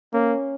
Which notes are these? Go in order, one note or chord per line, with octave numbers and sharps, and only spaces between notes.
A#3 C#4